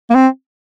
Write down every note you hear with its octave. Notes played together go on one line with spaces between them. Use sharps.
A#3
C4